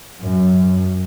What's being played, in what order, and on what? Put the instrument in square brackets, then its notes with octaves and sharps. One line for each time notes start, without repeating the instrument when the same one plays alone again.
[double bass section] F#2